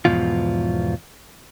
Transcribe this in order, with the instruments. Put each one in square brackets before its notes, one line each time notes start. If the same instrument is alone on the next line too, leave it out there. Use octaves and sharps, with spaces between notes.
[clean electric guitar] E2 G#2 B2 F3 F4